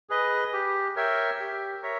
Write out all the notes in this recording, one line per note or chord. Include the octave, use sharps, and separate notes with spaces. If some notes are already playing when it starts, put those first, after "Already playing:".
G#4 B4 D#5
G4
A#4 C#5 E5 G5
G4
A#4 C#5 E5